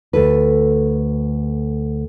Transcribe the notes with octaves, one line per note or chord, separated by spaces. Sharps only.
D2 A4 B4